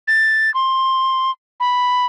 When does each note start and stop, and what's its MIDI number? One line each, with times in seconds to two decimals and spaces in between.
0.08 0.53 93
0.54 1.31 84
1.60 2.06 83